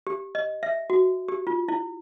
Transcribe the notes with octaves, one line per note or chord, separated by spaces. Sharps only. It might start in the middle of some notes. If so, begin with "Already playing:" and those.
G4
D#5
E5
F#4
G4
F4
E4